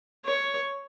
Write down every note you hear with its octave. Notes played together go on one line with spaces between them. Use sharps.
C#5